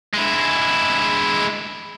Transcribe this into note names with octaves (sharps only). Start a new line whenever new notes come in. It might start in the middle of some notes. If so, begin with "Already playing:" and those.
G#3 E4